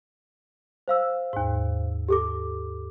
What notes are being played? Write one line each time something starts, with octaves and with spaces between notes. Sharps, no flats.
C5 F5 E6
D#2 G#2
G4 A4 D6